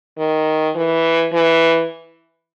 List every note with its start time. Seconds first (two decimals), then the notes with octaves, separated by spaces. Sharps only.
0.18 D#3
0.76 E3
1.33 E3